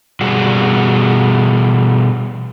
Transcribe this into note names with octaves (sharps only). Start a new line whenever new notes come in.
B2 G3 F#4 G#4